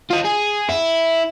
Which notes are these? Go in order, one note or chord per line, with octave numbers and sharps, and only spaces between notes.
F4 D#5
G#4
E4